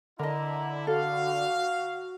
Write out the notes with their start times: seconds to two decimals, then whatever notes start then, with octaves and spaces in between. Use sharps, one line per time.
0.19 D3 E4 A#4 D#5 A#5
0.87 F#4 A4 F5